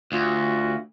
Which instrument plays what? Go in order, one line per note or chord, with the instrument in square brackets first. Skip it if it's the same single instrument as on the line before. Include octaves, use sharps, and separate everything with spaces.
[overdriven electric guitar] D2 [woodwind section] F4 F#4